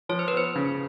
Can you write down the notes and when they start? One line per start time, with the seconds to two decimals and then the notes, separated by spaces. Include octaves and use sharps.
0.09 F3 C#5
0.19 C5
0.28 B4
0.33 B3 C5
0.56 C#3